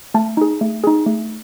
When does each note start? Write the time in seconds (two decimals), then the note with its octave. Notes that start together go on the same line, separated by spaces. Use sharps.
0.14 A3 A5
0.37 D#4 G#4
0.61 A3
0.84 D#4 G#4
1.06 A3